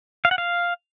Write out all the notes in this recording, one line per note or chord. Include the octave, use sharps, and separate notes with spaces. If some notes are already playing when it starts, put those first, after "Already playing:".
F5
F#5
F5